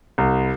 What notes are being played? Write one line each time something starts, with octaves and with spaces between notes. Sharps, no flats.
C2